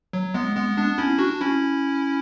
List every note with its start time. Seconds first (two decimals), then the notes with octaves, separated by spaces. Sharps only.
0.13 F#3
0.34 G#3 B3
0.55 G#3 B3
0.77 B3 D4
0.98 C#4 E4
1.19 D4 F#4
1.40 C#4 E4